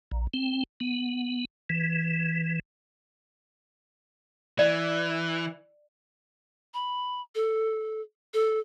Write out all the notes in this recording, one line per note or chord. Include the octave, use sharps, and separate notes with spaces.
A#1
C4
B3
E3
E3 D5
B5
A4
A4